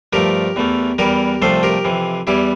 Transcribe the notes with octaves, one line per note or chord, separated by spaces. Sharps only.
G2 F3 A3 G4 A#4
E2 E3 A3
E2 E3 G3 G4 A#4
C2 C3 F3 A3 A4 C5
G4 A#4
F2 C3 E3
E2 E3 G3 E4 G4